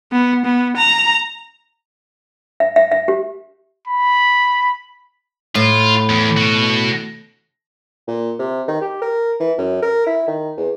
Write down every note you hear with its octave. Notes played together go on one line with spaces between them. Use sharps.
B3
B3
A#5
E5
E5
E5
G4
B5
A2 F4
E2
B2 F#4
A#2
C3
D#3
G4
A#4
E3
F#2
A#4
E4
D#3
E2